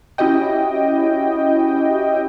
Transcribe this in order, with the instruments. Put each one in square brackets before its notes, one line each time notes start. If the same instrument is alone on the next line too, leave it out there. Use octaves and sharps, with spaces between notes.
[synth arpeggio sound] C#4 E4 F#4 G4 D#5 G5